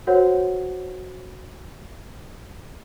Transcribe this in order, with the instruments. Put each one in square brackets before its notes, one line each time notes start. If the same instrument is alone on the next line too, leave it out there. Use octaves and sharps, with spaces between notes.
[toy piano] F#4 A#4 C5 C#5 F#5